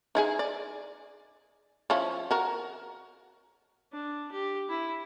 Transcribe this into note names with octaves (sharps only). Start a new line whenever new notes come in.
D#4 E4 G#4
D5
F3 C#4 E4
F#4 A#4
D4
G4
E4